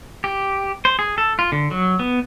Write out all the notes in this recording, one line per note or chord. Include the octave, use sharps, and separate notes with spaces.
G4
C5
G#4
A4
F4
D3
F#3
B3